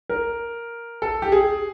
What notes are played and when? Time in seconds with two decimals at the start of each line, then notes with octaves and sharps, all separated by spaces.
0.10 A#4
1.02 A4
1.22 G4
1.32 G#4